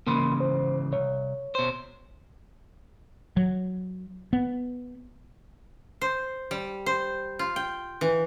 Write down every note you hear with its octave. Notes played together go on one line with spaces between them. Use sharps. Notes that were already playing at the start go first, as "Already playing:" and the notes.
G#2 C#3 E3 A#3 B5 C6
C5
C2 C#5
B2 C5
F#3
B3
C5
G3
C5
F4
G5
E3